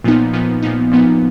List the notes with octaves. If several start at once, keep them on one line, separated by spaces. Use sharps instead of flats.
A#2 F3 B3 D#4
A#2 F3 B3 D#4
A#2 F3 B3 D#4
A#2 F3 B3 D#4